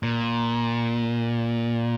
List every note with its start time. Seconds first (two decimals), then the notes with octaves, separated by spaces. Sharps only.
0.03 A#2